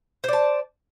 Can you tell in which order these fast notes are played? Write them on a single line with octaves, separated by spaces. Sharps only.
C5 D5 A5